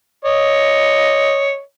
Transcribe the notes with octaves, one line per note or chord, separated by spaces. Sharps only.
C#5 D#5